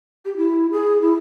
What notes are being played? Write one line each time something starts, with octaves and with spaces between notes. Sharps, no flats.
G4
E4
G#4
E4